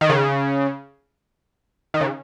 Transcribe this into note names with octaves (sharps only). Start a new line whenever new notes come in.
D#3
C#3
D#3
C#3